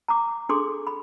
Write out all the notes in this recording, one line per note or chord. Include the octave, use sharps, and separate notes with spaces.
A#5 D6
D4 G#4 A4 C6 D6
B5